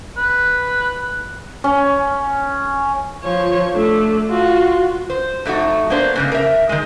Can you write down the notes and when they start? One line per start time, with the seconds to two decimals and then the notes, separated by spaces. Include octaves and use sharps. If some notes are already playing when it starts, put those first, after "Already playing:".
0.18 B4
1.64 C#4
3.23 F3 C#5
3.71 A3 D4
4.30 F4 F#4
5.10 C5
5.45 F2 A3 D#4 F#4
5.90 A#3 B3 D4 C5
6.16 G#2 C#3 A#3
6.32 A#4 E5
6.69 D#3 G#3